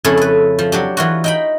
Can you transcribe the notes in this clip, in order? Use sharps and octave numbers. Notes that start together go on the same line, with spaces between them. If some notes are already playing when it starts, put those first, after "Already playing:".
F2 C#3 A3 E4 G#4 A4
A4 B4
F3
F#3 D4 G4
E3 F4 F#4
D#4 G5 B5